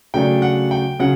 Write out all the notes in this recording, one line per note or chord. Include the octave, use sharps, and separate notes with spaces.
C#3 F#3 A3 D4 G5
F#5
G5
C#3 F#3 F#5